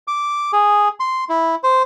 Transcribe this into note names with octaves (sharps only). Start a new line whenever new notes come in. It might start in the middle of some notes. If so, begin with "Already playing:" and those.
D6
G#4
C6
E4
C5